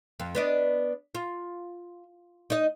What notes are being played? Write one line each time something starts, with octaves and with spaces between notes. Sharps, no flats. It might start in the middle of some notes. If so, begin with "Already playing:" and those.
F2
B3 D4 D#5
F4
D#4 D#5